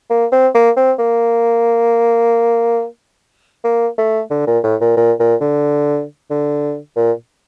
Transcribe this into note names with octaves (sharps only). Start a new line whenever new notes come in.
A#3
C4
A#3
C4
A#3
A#3
A3
D3
A#2
A2
A#2
A#2
A#2
D3
D3
A#2